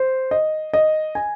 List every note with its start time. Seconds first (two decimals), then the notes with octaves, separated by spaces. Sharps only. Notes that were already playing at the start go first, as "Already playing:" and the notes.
Already playing: C5
0.31 D#5
0.73 D#5
1.15 G#5